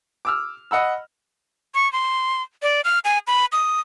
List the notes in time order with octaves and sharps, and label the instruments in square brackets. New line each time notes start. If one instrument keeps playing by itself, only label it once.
[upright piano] D6 E6 F6
D#5 F#5 B5 E6
[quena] C#6
C6
D5
F6
G#5
B5
D#6